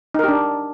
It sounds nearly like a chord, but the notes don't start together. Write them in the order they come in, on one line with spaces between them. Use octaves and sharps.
D#4 A#4 G4 D4